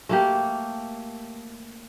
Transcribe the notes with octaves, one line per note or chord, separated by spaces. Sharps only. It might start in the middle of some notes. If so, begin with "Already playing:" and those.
A3 A#3 G4